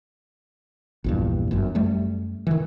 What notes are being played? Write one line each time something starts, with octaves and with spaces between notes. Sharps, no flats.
A#1 E2 G2
G1 F#2
F#2 G3 A3
D#3 E3